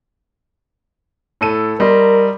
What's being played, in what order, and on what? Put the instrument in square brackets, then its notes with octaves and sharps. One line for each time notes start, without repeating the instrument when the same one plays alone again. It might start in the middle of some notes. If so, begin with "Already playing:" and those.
[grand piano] A2 A4 D#7
[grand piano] G3 D#5 C6 [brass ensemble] A#4